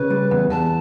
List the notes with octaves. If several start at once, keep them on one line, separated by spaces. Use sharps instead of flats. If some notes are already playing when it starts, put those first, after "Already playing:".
Already playing: C#3 B4
G3
E2
E2 A5